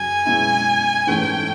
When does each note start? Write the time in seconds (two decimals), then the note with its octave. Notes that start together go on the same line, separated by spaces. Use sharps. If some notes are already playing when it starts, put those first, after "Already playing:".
Already playing: F#2 C#3 F#3 G#5
0.25 B2 G#3 C#4 E4
1.07 G#2 E3 A3 C#4 G5